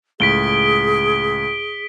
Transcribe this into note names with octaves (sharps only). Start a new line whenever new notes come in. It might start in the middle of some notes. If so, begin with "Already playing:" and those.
C#2 A2 G#4 B6 D7 G7